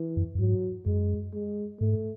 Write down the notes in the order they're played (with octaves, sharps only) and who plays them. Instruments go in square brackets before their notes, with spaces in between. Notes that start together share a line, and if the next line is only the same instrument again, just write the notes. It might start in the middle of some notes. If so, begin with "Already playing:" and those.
Already playing: [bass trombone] E3
[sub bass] F#2
F#2
[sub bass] G#2 [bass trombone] F#3
[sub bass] F#2 [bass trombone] G#3
[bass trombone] G#3
[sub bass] G#2 [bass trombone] A3